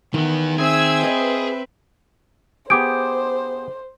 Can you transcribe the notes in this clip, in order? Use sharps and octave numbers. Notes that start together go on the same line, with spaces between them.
D#3 E3 B3
C4 G#4 E5 E6 G#6
B4 D#5
B3 G4 G#4 C5 D6 G6 D7